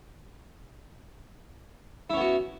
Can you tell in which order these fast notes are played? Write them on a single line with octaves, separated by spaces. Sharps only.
E4 C#4 B3 F#4